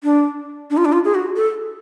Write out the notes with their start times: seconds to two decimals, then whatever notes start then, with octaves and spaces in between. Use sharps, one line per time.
0.04 D4
0.71 D4
0.77 F4
0.85 D4
0.93 F4
1.05 G#4
1.15 F#4
1.36 A4